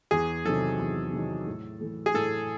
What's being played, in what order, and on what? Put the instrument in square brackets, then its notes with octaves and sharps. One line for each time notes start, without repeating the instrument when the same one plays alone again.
[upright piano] E2 [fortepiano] G#4
[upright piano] C3 D#3 F#3 [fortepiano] A4
[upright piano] E2
C3 D#3 F#3
A2
E3 A3
[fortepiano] G#4
[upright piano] A2 [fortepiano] A4